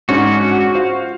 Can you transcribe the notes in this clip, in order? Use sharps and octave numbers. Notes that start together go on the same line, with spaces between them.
G#2 C#4 D4 F#4
F4 C5 F5